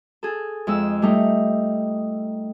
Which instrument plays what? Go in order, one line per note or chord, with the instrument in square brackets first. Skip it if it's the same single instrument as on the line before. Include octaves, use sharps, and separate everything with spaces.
[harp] G#4 A4
F2 G#3 E6
G3 A3 D#4